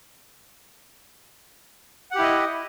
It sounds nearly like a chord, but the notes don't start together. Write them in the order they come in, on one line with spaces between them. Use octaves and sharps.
F#5 G4 E4 D#5